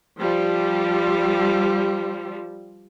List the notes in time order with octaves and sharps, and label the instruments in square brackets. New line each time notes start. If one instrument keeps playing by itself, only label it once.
[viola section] F3 G3